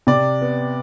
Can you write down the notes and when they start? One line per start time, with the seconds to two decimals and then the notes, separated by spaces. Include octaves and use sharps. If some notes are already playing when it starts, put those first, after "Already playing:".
0.07 C3 D5
0.41 B3